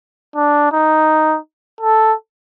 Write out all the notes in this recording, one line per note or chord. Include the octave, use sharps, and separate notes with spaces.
D4
D#4
A4